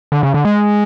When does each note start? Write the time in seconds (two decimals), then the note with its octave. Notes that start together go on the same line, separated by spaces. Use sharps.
0.12 D3
0.23 C#3
0.34 D3
0.45 G#3